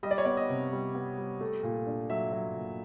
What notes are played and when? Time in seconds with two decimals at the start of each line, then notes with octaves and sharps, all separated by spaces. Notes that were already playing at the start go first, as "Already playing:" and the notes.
0.03 G3 D#5
0.11 D5
0.18 C#5
0.25 B3 D5
0.37 D#5
0.49 C3
0.73 G3
0.95 B3
1.18 G3
1.41 A3
1.63 A#2
1.87 D4
2.10 F#3 E5
2.32 F#3
2.56 A#2